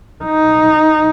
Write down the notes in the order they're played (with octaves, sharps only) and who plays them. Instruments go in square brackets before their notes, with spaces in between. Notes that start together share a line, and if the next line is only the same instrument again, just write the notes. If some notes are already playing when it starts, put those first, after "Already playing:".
[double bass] D#4